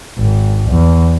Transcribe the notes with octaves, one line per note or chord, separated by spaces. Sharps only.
G#1
E2